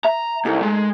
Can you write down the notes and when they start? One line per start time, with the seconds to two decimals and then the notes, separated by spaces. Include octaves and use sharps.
0.04 E5 A#5
0.45 C2 D#4 A4 A#4
0.63 G#3